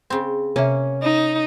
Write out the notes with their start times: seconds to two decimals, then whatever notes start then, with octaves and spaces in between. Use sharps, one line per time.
0.10 C#3 C4
0.56 C3 A#3 C#4 E5
1.03 D#4